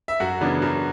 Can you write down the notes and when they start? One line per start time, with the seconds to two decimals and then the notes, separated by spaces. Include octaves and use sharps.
0.08 E5
0.20 F#2 F#4 F#5
0.41 C#3 E3 B3 D4
0.62 F#2